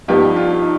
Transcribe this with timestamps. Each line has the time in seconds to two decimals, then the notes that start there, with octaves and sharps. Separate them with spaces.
0.08 G2 F3 B3 D#4 G4
0.36 D4 F4
0.62 D#4